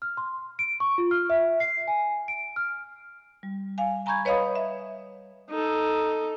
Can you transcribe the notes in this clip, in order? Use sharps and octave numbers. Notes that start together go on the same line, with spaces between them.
F6
C6
D7
C#6
F4
F6
E5
C7
G#5
D7
F6
G3
F5 G#5
G#5 A#5 B5 C#6 G6 G#6
B4 C#5 D#5 F5 B5 D#6
E5
D#4 A4